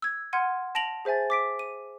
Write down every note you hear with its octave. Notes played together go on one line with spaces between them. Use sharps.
E6 G#6
F#5 C6 F6 G#6 D#7
A5 A#6 D7 F7 F#7
G#4 C5 E5 G#5 A6
D6 B6 D7
D#7